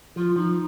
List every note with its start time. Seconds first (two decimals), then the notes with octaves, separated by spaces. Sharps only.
0.16 F3 F4
0.36 F3 D#4